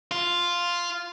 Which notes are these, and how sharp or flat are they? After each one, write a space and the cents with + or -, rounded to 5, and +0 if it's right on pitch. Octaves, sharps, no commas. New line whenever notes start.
F4 +0